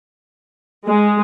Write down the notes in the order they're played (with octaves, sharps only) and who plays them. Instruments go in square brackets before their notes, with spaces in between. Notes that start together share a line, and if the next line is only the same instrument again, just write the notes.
[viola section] G#3